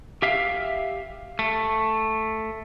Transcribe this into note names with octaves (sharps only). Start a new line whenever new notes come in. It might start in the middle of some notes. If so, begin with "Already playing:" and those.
G4 E5 F5
A3